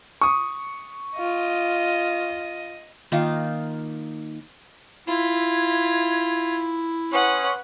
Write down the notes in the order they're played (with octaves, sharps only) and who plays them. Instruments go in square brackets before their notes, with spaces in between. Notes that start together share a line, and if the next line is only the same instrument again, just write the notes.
[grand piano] C#6 D#6
[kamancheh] F4 [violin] D#5
[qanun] D#3 A#3 D#4 F4
[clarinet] E4 [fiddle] F4 [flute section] E5 G#6
[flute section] C#4 C6 D#6 [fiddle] B4 F#5